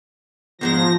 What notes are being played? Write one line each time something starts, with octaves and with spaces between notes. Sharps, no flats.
E2 G#2 F3 G#3 A#6